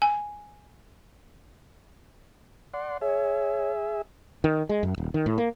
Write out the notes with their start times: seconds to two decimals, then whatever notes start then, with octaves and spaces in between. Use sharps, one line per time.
0.02 G#5
2.74 D5 F#5 C6
3.02 G#4 C#5 E5
4.44 D#3
4.69 G#3
4.83 F#2
4.98 D#1
5.14 D#3
5.26 A2
5.38 A#3